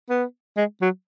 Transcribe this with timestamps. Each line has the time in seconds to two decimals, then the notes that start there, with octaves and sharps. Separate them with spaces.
0.10 B3
0.57 G#3
0.81 F#3